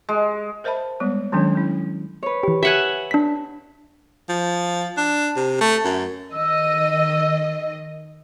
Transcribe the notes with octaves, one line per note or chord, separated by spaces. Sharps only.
G#3
A#4 C5 D#5 E5 A5 B5
G3 G#3 B3
D#3 F#3 G#3 C#4 D4
C#4 E4
B4 C#5
E3 G4
G4 E5 F#5 G#5
D4 B6
F3
D4
C3
A3
F#2
D#3 D#5 E6